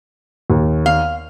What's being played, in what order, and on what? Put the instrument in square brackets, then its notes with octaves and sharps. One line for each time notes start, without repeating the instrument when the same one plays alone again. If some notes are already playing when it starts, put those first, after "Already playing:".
[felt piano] D#2
[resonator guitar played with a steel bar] F5